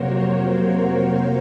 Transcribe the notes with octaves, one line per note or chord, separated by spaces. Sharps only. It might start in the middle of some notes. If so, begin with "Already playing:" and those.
Already playing: F2 C3 F#3 A#3 F#4 A#4 C5 C#5
F#4